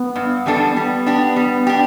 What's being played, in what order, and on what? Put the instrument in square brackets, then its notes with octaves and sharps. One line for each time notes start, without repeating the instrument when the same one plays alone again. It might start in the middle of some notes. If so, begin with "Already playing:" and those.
Already playing: [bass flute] B3
[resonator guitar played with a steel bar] G2
E3 G3 D4 A4
[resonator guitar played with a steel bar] G3 [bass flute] B3
[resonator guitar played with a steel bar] D4 G4
G3
D4 G4